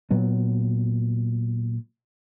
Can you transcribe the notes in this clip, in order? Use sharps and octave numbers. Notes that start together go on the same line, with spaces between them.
A#2 F#3 B3